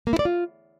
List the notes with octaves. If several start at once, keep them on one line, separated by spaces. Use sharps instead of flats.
A#3
E4
D5
F4